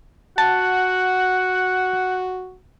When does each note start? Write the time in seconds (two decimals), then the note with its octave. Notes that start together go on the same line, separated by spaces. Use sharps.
0.38 F#4 F#5 A5